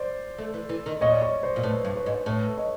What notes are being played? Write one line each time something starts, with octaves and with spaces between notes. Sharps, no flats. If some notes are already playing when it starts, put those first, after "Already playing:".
Already playing: C5 D5
A3
E3
E3
D#3
A#2 C#5 D#5
D5
C#5 D#5
C5 D5
A#2
A2 B4 C#5
G2
B4 C#5
G#2
A2 B4 C#5
C#5 D#5